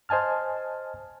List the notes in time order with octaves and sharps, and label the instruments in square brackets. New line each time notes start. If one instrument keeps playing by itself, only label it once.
[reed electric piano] C5 D#5 G#5 A5 F6